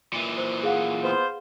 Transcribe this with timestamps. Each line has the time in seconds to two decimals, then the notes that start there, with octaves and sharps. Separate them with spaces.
0.13 A#2 E3
0.37 C5
0.63 G#4 F5 F#5
1.03 B3 F4 C5